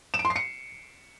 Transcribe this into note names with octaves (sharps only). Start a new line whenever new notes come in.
E7
D7
C6
C7
C#7